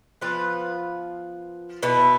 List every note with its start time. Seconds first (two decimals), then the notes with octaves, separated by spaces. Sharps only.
0.21 F3 B3 F4 B4
1.83 B2 B3 E4